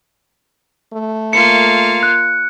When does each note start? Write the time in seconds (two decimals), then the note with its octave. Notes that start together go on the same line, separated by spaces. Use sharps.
0.93 A3
1.33 A#3 F4 C#7
2.03 F#6